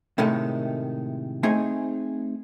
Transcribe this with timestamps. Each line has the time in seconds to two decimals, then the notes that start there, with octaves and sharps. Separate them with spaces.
0.18 A2 C3 D#3 G#3 A3
1.43 A3 C4 D#4 G#4 G#5